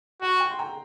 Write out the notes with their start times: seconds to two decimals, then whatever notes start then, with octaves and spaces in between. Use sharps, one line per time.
0.21 F#4 F#5
0.40 G5
0.51 C6
0.59 G5 A#5